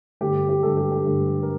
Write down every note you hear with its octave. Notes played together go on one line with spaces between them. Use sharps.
G2 D3 A3 G4
G4
G2 D3 A3 A4
G4
G4
G2 D3 A3
A#4